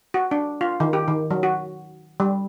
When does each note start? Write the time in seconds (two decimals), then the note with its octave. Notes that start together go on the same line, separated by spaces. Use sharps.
0.14 F#4
0.31 D4
0.61 F4
0.80 D#3
0.93 G4
1.08 D#3
1.31 F#3
1.43 F#4
2.20 G3